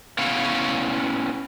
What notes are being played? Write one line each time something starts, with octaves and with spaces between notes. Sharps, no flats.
B3 C#4 E4 C#5 F5